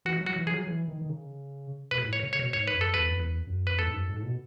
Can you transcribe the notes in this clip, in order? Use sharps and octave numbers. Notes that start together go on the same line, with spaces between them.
E3 F#4
F#3
F#4
E3
E3 G#4
F#3
E3
D#3
D#3
C#3
B2 B4
G#2
A2
C#5
C#3
C#5
B2
G#2 C#5
B4
F#2
A4
E2 B4
F#2
E2
F#2
F#2 B4
E2 A4
G#2
F#2
G#2
A2
B2